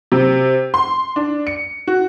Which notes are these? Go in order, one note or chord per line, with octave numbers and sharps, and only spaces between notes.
C3
C6
D4
C#7
F#4